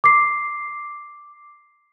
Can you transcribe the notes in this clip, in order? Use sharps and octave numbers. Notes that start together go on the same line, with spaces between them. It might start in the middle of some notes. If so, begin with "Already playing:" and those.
D6 C7